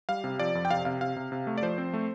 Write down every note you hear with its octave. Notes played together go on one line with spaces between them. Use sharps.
G3 F5
C3
F3 D5
F2
G5
C3 F5
C3 F5
C3 F5
C3
C3
A3
D5
F3 C5
C4
A3